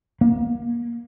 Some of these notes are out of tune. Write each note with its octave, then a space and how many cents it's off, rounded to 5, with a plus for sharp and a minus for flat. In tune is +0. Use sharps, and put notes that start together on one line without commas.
A#3 +25